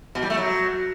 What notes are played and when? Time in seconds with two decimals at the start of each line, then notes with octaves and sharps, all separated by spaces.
0.15 B2
0.23 G3
0.30 A3
0.37 F#3